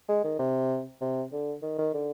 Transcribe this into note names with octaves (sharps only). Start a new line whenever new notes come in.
G#3
D#3
C3
C3
D3
D#3
D#3
D3